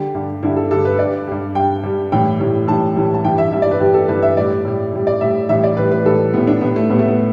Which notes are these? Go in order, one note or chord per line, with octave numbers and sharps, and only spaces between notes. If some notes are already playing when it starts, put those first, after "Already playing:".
Already playing: D3 G3 G4
G2 D3 G3
G2 D3 G3 E4
A4
G2 D3 G3 A4
B4
G2 G3 D5
G2 G3
G2 G3 G5
G2 G3
A2 E3 G3 G5
A2 E3 G3
A2 E3 G3 A5
A2 E3 G3
A5
G2 E3 G3 G5
E5
G2 E3 G3 E5
D5
B4
G2 E3 G3 G4
A4
G2 E3 G3 B4
E5
A2 G3 D5
A2 G3
A2 G3
D5
A2 G3 E5
A2 E3 G3 E5
D5
A2 E3 G3 B4
B4
A2 E3 G3 A4
A2 E3 G3 B3
D4
A2 G3 B3
A3
A2 G3 B3
A3
B3